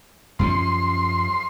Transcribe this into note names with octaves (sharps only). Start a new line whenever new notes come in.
F#2 F3 C#4 C6